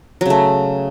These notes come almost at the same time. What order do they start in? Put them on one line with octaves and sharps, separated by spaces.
F#3 C#3 A3